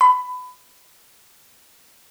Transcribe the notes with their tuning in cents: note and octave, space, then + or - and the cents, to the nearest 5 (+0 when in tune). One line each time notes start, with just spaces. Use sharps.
B5 +25